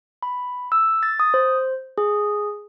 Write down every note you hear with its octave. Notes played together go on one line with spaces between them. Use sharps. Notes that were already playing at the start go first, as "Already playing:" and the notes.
B5
E6
A6
D#6
C5
G#4